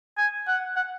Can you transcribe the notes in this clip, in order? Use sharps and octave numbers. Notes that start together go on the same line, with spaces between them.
G#5
F#5
F#5